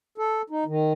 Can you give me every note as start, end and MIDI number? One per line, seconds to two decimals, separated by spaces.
0.18 0.42 69
0.50 0.64 63
0.66 0.93 51